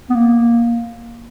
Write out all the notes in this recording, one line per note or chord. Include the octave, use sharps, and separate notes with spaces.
B3
A#3